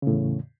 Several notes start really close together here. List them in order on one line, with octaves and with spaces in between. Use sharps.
C#3 A2 E2